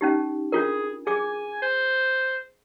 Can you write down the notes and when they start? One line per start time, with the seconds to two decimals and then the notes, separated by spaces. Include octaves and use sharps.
0.01 C#4 D#4 G4
0.52 D4 F4 G#4 A#4
1.07 G#4 G#5 D6
1.62 C5